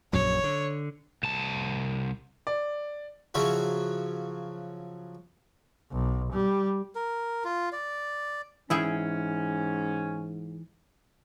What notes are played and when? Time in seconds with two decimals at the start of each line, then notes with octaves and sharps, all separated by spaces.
0.13 A#1 F#2 F#3 C#5
0.44 D3
1.23 C2 A5
2.47 D5
3.34 C#3 F3 F#3 E4 F#4
5.92 B1
6.33 G3
6.95 A#4
7.44 F4
7.72 D5
8.70 G#2 E3 C#4 E4 G#4 G5